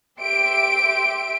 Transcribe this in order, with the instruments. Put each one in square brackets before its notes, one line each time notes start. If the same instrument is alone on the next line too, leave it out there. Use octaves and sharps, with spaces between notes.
[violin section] G4 E5 C6 D7